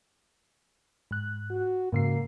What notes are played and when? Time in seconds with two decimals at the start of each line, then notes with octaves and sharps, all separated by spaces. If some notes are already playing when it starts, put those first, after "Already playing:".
1.11 G#2 F#6
1.50 F#4
1.92 G#2 C#3 A#3 C7